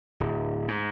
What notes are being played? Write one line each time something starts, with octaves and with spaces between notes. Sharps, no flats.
D1
G#2